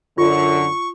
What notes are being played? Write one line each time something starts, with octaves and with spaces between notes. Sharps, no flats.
F#2 D3 F4 C#6